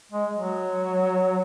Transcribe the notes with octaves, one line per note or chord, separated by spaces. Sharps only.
G#3
F#3